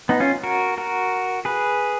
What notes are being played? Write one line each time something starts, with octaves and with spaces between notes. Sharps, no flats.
B3 D#4
C#4 F4
F#4 A#4
F#4 A#4
G#4 B4